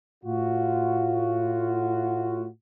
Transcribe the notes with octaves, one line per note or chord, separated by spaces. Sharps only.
A2 F4 F#4